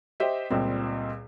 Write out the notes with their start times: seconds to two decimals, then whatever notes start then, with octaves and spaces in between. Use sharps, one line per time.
0.20 G4 C5 D#5 E5 G5
0.50 C#2 A#2 G3 C4